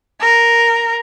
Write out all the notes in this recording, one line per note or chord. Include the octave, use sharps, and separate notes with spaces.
A#4